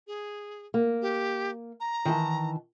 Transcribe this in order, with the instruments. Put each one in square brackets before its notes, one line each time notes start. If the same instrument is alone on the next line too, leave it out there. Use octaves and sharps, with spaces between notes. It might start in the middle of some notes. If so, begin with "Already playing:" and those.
[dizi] G#4
[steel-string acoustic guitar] A#3
[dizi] G4
A#5
[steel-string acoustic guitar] D#3 E3 A5